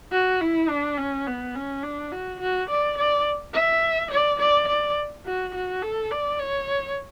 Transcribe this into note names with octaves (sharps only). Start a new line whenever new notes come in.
F#4
E4
D4
C#4
B3
C#4
D4
F#4
F#4
D5
D5
E5
D5
D5
D5
F#4
F#4
A4
D5
C#5